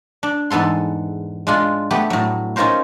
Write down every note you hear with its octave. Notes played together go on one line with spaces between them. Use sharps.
D4
E2 G#2 B3 A4 C6
G#3 D4 F4
A3 B3 G4
A2 F#3
C#4 D#4 F4 A#4 C5 C#5